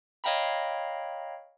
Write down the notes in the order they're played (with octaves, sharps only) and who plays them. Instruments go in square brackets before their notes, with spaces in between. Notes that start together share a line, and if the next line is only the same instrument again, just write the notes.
[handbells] C#5 D#5 F5 G5 A#5 B5